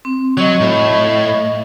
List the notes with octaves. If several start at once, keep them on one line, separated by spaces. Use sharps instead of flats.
C4
F#3 D#5 C#6
A2